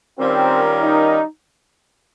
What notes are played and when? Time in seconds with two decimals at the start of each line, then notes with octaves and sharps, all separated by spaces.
0.19 D#3 G3 C4 C#4 F4 A#4
0.81 D#4